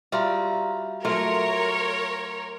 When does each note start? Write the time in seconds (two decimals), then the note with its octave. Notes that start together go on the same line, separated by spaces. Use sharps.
0.12 G3 F4 F#4 E5 F5 A#5
1.05 F#3 A3 F4 A#4 C#5 C6